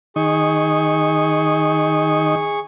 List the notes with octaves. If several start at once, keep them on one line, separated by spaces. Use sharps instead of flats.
D#3 D#4 G#4 C#6